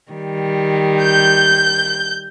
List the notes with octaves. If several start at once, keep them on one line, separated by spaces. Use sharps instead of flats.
D#3 G3
G6